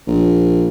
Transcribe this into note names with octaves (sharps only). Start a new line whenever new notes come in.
A#1